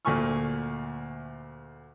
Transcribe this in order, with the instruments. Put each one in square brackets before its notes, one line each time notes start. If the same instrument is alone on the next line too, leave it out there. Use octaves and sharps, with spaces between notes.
[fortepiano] D2 A#2 A3 G#5 C#6 F6